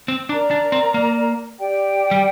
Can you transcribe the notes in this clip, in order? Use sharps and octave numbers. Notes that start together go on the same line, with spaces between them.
C4
D4 A#4 D5 A#5
D4
C4
A#3
G4 D5 G5
G3